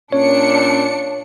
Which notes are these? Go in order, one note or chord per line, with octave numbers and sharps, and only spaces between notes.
A#2 C#4 D4 C#5 C#7